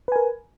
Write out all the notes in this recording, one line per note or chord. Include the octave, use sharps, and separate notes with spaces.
A#4 B4 G#5